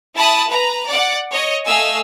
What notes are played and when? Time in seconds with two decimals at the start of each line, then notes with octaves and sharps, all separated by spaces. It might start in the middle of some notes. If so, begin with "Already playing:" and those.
0.14 E4 A5 B5 D#6
0.49 B4 A#5
0.87 D5 F#5
1.31 C#5 D#5
1.66 A3 D#5 F5 G#5 E6